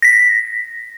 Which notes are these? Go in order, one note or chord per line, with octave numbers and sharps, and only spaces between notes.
A#6 B6